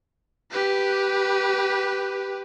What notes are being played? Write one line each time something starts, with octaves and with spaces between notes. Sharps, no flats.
G4 B4